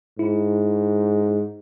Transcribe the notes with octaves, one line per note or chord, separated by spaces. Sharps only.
G#2 E4